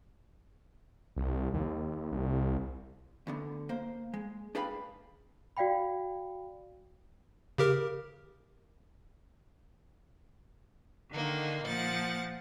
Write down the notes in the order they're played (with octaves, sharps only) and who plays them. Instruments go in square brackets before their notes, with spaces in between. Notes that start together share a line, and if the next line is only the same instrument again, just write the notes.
[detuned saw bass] C2
D#2
C2
[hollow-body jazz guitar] D2 D3 B3
A#3 C5
G#3
D4 G#4 B4 F5 G5 B5
[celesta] F#4 D5 F5 G5 B5
[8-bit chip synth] C#3 G4 A#4
[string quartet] D3 D#3 A#3 D#4
A#2 F3 F#5 A6